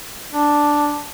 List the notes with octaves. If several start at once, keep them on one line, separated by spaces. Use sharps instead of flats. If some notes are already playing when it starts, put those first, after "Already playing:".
D4